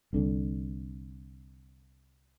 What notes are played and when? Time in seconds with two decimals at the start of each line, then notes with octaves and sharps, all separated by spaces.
0.13 C2 D3